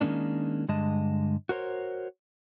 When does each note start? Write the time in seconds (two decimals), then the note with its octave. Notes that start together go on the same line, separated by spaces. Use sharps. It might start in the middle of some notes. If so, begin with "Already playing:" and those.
0.01 D#3 G#3 A#3 C#4 D4
0.68 G2 D3 G#3 D#5 A5
1.49 F#4 A#4 C5 C#5